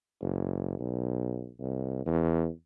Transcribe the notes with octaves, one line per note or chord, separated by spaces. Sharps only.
F#1
B1
C2
E2